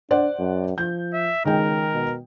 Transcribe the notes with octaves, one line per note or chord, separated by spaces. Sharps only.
D4 C5 D5 F#5
F#2
F3 G6
E5
C#2 D#3 G#3 A#4 G5
B2